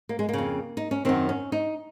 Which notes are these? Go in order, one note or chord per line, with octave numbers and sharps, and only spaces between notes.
A#3
G#3
C#3 A#3
F2
D#4
C#4
F#2 D#3 C4
C#4
D#4